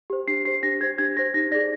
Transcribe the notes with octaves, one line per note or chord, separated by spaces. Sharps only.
G4 C5
D4 C7
G4 C5 C7
D4 A#6
G4 C5 G#6
D4 G#6
G4 C5 A#6
D#4 A#6
G#4 D5 A#6